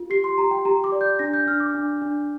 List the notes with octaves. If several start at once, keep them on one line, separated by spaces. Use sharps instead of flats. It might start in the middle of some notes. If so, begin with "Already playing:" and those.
Already playing: F4
G4 C7
C6
G4 A#5
G5
G4 A#5
D6
D5
G6
D4 A#6
G6
D4 F6
D6
D4
D4